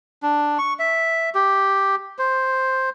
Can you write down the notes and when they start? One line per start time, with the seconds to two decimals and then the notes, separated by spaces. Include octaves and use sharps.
0.23 D4
0.59 C#6
0.79 E5
1.35 G4
2.19 C5